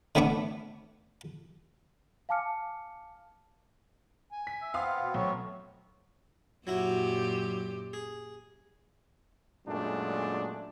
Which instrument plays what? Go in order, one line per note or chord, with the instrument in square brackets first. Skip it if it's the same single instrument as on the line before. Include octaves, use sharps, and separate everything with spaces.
[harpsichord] D3 A3 B3 D4 C#6 D6
[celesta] F5 G#5 A5 D6 F6 C#7
[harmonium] G#5
[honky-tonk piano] B6
[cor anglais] E5
[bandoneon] B3 C4 [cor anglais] F4 [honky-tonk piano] F5 D#6
[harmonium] B2
[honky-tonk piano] B1 [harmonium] A3 [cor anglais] C#5
[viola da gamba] F#2 A#2 G4 [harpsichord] F#3 E4 F#4
[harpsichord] G#4
[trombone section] F#2 A#2 G#3 A3 D4